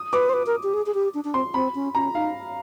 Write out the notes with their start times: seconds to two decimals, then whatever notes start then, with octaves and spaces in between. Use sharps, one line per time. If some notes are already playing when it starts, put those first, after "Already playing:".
Already playing: D#6
0.13 B4 D6
0.29 C5
0.33 B4
0.46 A#4
0.63 G4
0.73 G#4
0.86 G#4
0.94 G4
1.14 D4
1.24 D4
1.34 C4 C6
1.54 C4 B5
1.75 C#4
1.95 C#4 A#5
2.14 D#4 F5